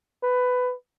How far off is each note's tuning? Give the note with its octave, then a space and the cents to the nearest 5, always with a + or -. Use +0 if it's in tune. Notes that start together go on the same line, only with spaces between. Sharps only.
B4 +15